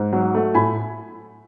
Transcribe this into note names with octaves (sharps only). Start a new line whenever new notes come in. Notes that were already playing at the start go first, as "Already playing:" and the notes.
Already playing: G#2
F#3
A3
A2 G#5 B5